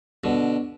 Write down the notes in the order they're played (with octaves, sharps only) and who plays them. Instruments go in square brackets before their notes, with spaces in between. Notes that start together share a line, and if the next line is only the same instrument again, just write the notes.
[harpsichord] B2 D3